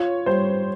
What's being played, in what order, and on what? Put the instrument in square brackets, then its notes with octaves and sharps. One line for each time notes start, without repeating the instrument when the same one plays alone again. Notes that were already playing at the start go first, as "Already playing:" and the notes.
Already playing: [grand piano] F4 [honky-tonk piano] C#5
[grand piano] G3 [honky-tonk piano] C5